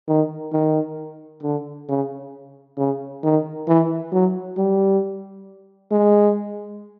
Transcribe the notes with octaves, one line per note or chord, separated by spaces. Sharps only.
D#3
D#3
D3
C#3
C#3
D#3
E3
F#3
G3
G#3